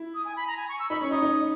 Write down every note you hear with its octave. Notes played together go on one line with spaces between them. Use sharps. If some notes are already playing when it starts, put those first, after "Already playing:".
Already playing: E4
D#6
G#5
B5
A#5
G#5
C#6
E6
D#4 B5
C#4 C#6
D#4 D#6
D#4